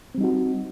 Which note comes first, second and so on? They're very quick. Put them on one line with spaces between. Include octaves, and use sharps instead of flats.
C4 G3 D#4 F#4